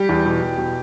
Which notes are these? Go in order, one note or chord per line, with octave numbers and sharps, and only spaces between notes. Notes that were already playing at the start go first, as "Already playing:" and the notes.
Already playing: G3 G4
E2
B2
E2
B2